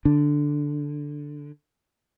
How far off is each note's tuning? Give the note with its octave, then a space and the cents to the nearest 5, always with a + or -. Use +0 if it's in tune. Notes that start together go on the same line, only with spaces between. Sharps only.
D3 +0 D4 +0